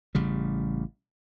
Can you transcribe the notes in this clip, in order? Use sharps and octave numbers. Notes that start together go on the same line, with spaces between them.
A1 C#3 G3